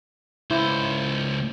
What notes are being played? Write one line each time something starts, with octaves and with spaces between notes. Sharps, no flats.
C#2 E4 C5